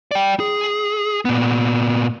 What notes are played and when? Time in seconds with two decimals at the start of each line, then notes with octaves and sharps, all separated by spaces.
0.11 D5 G5
0.40 G#4
1.25 A#2 B3